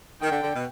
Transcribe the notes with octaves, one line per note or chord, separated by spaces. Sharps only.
D#3 G5
D3
D3
B2